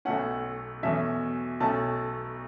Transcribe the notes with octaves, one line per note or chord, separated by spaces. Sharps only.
B1 B2 A3 C#4 F#5
E2 B2 F#3 A3 C#4 E5
B1 B2 A3 C#4 A5